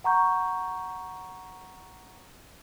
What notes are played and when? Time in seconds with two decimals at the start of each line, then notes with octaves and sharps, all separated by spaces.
0.04 F#5 A#5 C#6 G6